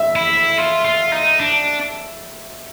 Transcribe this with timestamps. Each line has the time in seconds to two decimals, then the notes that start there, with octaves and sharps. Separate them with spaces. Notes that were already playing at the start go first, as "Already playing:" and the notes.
Already playing: E5
0.16 E4
0.58 F4
0.85 F4
1.12 D#4
1.40 D4